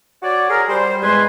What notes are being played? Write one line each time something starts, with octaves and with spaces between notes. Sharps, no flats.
F#4 C#5 D5
G#4 A#4
G3 C5
E2 G#3 B4 G#5 C6